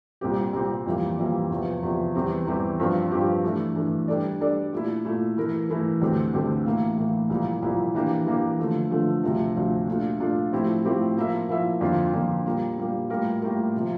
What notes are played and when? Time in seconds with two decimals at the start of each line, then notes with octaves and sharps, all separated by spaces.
0.21 C2 A#2 G3 C4 G4
0.53 C2 A#2 G3 C4 G4
0.86 F2 E3 G3 A#3
1.18 F2 E3 G3 A#3
1.50 E2 C3 F3
1.82 E2 C3 F3
2.15 E2 E3 G3 C4 G4
2.47 E2 E3 G3 C4 G4
2.79 G2 F3 C4 G4
3.12 G2 F3 C4 G4
3.44 E3 A3 D4
3.76 E3 A3 D4
4.08 G3 D4 A4 D5
4.40 G3 D4 A4 D5
4.73 A#2 A3 E4
5.05 A#2 A3 E4
5.37 E3 A3 E4 A#4
5.69 E3 A3 E4 A#4
6.01 D2 D3 A3 C4 G4
6.33 D2 D3 A3 C4 G4
6.66 A2 E3 A#3
6.97 A2 E3 A#3
7.30 C2 A#2 F3 A#3 E4
7.62 C2 A#2 F3 A#3 E4
7.95 E3 A#3 D4 G4
8.26 E3 A#3 D4 G4
8.59 D3 F3 A3
8.91 D3 F3 A3
9.24 D2 C3 F3
9.56 D2 C3 F3
9.88 A#2 A3 D4 F4
10.20 A#2 A3 D4 F4
10.52 A2 F3 C4 E4 G4
10.85 A2 F3 C4 E4 G4
11.17 F3 A#3 E4 A#4 E5
11.49 F3 A#3 E4 A#4 E5
11.81 F2 D3 F3 A#3 F4
12.13 F2 D3 F3 A#3 F4
12.46 A#2 G3 A#3
12.77 A#2 G3 A#3
13.10 A2 G3 A#3 F4 A#4
13.42 A2 G3 A#3 F4 A#4
13.76 C3 F3